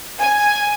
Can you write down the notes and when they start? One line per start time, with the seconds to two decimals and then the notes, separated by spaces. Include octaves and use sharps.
0.19 G#5